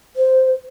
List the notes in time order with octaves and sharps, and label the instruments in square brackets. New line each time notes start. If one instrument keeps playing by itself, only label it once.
[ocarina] C5